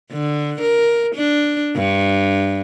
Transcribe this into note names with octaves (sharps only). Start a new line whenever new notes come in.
D3
A#4
D4
G2